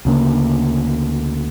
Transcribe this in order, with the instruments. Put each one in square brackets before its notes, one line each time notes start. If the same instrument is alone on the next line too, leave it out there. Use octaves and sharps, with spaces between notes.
[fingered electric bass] D2 C#3 A#3